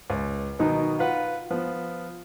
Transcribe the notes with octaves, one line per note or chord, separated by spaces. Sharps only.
C#2
B2 D#3 F#3 D#4
F4 B4 F#5
F3 B3